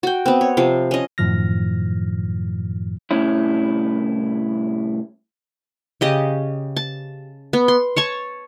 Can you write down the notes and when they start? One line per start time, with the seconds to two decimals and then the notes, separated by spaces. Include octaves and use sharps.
0.03 F#4 G5
0.26 B3 C4
0.41 C#5
0.57 C3 F3 F5
0.91 C#4 D#5
1.18 F#2 A2 D#3 F3 F6 A#6
3.11 C2 A2 C#4 E4
6.01 C#3 G4 D#5
6.77 A5
7.53 B3
7.68 C6
7.96 C#5 A5 C#6